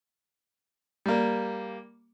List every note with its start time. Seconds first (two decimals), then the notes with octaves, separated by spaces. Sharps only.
1.06 G3 A#3